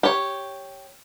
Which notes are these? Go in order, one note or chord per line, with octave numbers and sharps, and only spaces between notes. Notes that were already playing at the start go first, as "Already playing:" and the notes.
G4 C#5